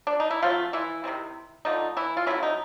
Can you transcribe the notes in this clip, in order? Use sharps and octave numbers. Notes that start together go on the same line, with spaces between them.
D4
D#4
E4
F3 F#3 A3 C#4 F4
E3 E4
C3 D#3 G#3 C4
D3 F3 A3 D#4
E3 E4
F4
E3 F#3 A3 C#4 E4
D#4